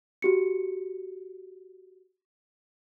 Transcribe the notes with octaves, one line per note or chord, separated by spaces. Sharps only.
F#4 G4 C#7